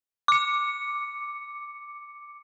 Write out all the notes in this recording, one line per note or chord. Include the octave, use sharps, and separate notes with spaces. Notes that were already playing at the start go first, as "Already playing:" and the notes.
D6 C#7